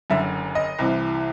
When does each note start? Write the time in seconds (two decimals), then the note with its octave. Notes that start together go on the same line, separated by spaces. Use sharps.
0.10 F#1 F#2 D3 E5
0.55 D#5
0.79 C2 C3 E3